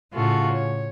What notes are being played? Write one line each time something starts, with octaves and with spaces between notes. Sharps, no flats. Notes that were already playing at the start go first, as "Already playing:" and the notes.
A2 C#3 F4 F#4 A4
C#5